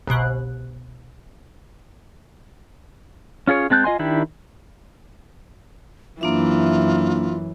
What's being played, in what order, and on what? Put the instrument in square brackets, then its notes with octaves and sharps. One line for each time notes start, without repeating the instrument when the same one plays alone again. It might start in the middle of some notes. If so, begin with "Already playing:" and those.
[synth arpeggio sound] G1 C2 B2 F#6
[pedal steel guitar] C#4 F4 G#4 C#5
G#3 C4 A5 F#6 G6
F4 D#5 G#5 C6
D#3 D4 E4 G4
[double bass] F#2 [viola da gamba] E3 [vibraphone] A#3 D4 E5 [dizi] F4